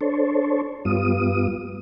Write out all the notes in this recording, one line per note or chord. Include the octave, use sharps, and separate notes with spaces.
D4 A4 C5 C#5
G2 G3 B3 F4 D#6